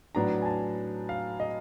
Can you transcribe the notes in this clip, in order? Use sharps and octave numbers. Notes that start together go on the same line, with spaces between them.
A2 F#3 B3 D4 A#5
G#5
A5
F5
D#5